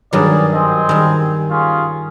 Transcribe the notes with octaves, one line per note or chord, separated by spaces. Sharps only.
G2 D#3 F#3 G#4 D5
C4 D#5 G#5
D#3 G3
C#4 F4 G#4